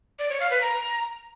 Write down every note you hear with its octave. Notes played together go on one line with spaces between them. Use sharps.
D5
C#5
F5
B4
A#5